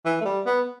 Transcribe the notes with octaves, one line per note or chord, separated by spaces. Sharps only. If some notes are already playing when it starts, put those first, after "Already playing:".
E3
A3
G3
B3